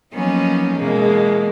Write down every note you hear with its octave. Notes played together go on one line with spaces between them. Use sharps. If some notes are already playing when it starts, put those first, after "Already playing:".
F3 F#3 A#3 B3 C#4 D#4
B2 E3 G#3 A#3